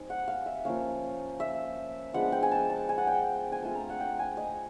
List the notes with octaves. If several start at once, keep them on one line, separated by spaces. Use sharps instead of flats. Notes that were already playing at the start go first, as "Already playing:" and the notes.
Already playing: G3 C4 D#4 G#5
F#5
F5
E5
F3 A#3 C#4 F5
E5
F3 G#3 B3 D4 F#5
G5
G#5
A5
A5
G#5
F#5
G5
G#5
A3 C4 F4 A5
A#5
F#5
G5
G#5
D#5